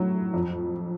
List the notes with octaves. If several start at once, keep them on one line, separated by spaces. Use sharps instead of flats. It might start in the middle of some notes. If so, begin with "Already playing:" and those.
Already playing: A2 F#3
F2